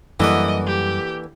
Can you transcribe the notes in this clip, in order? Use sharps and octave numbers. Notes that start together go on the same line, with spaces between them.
F#2 D3 E3 G3 A#3 D#5 F#5
G4